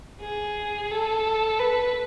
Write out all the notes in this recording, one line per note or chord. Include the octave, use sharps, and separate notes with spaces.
G#4
A4
B4